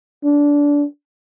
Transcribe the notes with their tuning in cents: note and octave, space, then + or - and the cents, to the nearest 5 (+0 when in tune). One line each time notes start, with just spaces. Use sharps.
D4 -20